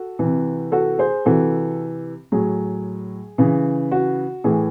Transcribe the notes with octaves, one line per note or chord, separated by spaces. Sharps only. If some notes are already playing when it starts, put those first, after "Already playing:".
Already playing: F#4 A4
C3 E3
F#4 A4
G#4 C5
C3 E3 F#4 A4
A2 F#3 G#4
C#3 E3
F#4
A2 E3 G#4